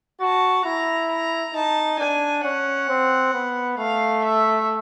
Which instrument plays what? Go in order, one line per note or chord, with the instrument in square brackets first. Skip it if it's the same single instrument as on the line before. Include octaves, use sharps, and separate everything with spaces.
[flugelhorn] F#4 [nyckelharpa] A5
[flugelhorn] E4 [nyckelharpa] A#5
[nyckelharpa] A#5
[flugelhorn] D#4 [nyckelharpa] A5
[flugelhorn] D4 [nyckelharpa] G#5
[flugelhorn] C#4 [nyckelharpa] F#5
[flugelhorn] C4
B3
[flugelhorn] A3 [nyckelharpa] F5
[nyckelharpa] E5